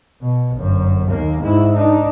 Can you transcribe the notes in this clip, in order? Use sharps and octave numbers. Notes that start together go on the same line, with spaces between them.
B2
G1 F#2
D#2 A#3
G#2 E4
D4 D#4